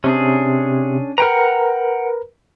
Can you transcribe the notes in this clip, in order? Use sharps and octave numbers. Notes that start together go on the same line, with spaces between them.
C3 C#4 D4 G#4
A#4 B4 F#5 G5 A#5